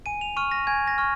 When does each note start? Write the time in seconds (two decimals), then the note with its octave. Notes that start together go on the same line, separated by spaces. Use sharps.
0.06 G#5 D#7
0.21 F7
0.37 C#6 F6 D#7
0.51 A#6
0.67 G#5 G#6
0.87 A#6
0.98 C#6 F6